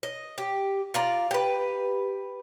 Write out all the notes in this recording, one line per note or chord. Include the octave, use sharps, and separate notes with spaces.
D#5
G4
F4 D5 A#5
G4 B4